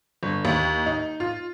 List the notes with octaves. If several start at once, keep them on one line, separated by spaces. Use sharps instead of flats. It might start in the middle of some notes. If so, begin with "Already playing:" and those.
G1
D#2
D#4
F4